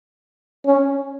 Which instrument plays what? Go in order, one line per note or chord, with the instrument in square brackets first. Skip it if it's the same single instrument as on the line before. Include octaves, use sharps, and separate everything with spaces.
[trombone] C#4